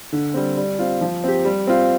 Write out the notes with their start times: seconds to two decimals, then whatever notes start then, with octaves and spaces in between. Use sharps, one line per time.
0.13 D3
0.34 G3 C4
0.57 G3
0.79 C4 F4
1.01 F3
1.24 C4 G4
1.45 G3
1.67 C4 F4